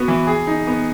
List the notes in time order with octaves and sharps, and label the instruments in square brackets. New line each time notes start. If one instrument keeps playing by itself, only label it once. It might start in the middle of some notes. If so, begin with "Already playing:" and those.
Already playing: [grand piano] B3 F#4
E3
G#4
D#4
B3